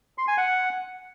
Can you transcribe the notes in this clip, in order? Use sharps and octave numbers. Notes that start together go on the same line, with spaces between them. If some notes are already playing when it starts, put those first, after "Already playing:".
C6
G#5
F#5